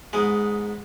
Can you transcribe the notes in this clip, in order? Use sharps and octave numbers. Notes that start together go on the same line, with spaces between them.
G#2 G#3 B3 G#4